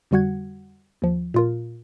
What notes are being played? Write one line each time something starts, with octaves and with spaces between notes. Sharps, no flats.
F2 D3 G3 F#4 F#5 G#6
D#2 F3
A#2 F4 A#4